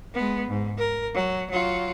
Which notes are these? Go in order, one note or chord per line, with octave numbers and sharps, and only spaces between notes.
G#3 B3
G#2
A#4
F#3
F#3 F4